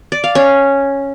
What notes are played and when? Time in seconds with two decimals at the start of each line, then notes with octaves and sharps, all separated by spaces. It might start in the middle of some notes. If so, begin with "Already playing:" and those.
0.12 D5
0.24 F5
0.35 C#4